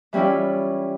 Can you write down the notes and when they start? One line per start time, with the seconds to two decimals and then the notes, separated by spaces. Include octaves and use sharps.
0.13 E3 G3 C#4 E4 F4